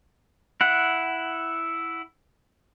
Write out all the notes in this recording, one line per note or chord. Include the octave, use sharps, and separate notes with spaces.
E4 F#5